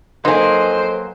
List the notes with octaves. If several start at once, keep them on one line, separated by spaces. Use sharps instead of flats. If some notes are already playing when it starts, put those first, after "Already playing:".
F#3 A#3 D#4 G#4 A4 B4 C5 C6